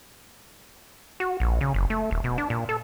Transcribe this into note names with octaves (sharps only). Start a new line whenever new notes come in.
F#4
A#1
C#3
F#1
A3
D#1
B2
D4
A#2
A4